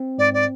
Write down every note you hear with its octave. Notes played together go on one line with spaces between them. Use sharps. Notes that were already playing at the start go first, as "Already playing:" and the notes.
Already playing: C4
G#2 D5
D5